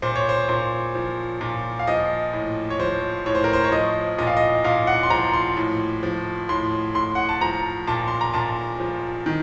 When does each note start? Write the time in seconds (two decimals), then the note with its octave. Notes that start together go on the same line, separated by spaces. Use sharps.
0.02 A#2 C5
0.15 C#5
0.29 C5
0.49 A#2 C5
0.95 F3
1.41 A#2
1.79 F5
1.87 F3 D#5
2.33 A2
2.70 C#5
2.79 F3 C5
3.26 A2 C#5
3.35 C5
3.44 A#4
3.53 C5
3.64 C#5
3.72 F3 D#5
4.18 A#2 D#5
4.27 F5
4.37 D#5
4.64 A#2 F5
4.87 F#5
5.03 C6
5.10 F3 A#5
5.33 C6
5.57 A2
6.03 F3
6.49 A2 C6
6.95 A2 C6
7.15 F#5
7.29 A5
7.41 F3 A#5
7.87 A#2 A5
8.08 C6
8.21 A#5
8.34 A#2 A5
8.80 F3
9.26 D#3